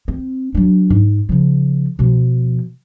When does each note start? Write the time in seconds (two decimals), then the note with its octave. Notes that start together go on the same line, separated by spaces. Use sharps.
0.08 C4
0.55 F#3 D4
0.90 G#2
1.29 C#3 F3
1.99 B2 F3